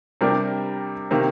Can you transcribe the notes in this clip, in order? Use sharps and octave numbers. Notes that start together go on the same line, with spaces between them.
C3 G3 D4 G4 A#4
C3 D#3 A#3